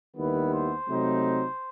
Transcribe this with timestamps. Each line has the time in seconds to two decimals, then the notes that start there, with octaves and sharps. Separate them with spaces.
0.16 D#2 D#3 G3 B3 E4 B4
0.52 C5
0.88 C3 F#3 A3 C4 D#4